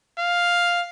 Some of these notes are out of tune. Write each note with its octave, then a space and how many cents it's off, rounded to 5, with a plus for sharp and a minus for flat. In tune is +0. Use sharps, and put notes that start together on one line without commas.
F5 +5